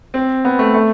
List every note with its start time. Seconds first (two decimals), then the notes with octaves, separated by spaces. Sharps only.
0.14 C4
0.45 B3
0.59 A3
0.74 A3